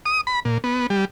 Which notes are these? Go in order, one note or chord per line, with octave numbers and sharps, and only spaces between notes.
D#6
B5
A#2
B3
G3